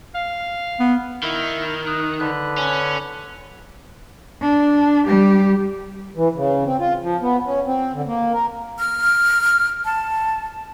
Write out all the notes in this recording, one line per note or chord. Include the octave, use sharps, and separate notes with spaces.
F5
B3
D#3 E4
D#6 F#6
D3 B4 F#6
C#4
D4
G3 G4
E3
C#3
C4
F4
F3
B3
C#4
C4
D3
A#3
A#4
F6
A5